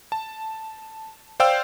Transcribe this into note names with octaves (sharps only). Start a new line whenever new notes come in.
A5
C5 D5 F5 G5 E6